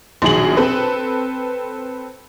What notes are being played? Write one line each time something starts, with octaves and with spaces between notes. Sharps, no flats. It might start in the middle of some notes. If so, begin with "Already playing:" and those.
A#1 B2 D#3 F#3 G#4 F#7
C4 A4 B4